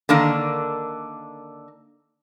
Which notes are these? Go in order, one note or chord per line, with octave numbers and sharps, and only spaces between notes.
D3 D#3 A#3 D4